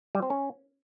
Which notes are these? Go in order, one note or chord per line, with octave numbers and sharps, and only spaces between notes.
G3
C4
C#4